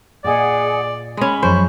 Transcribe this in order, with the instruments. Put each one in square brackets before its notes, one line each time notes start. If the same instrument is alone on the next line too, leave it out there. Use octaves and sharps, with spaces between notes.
[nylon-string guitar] A#2 D#5 [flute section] G#4 F#5 [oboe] D5
[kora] G#3 C#4 [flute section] B5
[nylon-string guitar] F#2 F3 G#4 [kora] C5 [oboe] C#6